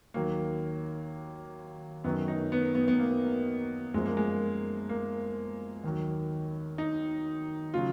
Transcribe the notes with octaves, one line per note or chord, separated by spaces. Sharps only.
D#2 D#3 F#3 A#3
F#2 D#3 F#3 B3
D#4
B3
B3
B3
A#3
F#2 F3 G#3
A#3
G#3
A#3
D#2 D#3 F#3
D#4
C#3 F#3 F4